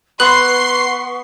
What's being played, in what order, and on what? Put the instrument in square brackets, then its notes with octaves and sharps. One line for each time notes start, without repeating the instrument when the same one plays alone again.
[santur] B3 [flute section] B4 F#5 C#6 [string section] C6 C7 [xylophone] F#6 F#7